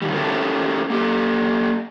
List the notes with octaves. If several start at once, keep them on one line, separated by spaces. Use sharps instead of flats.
D3 D#3 G3
C#4 E4 G4 A4 A#4
A#3 G4 A4